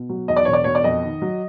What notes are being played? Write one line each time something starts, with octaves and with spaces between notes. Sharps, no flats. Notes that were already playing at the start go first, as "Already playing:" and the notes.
Already playing: B2
F#3
E2 D#5
D5
E1 C#5
D5
B2 C#5
D5
F2 D#5
D#3
F#3